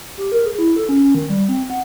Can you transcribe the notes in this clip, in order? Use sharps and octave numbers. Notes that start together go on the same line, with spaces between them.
G4
A#4
G#4
E4
A4
C#4
C#4
D#3
G3
C4
F#5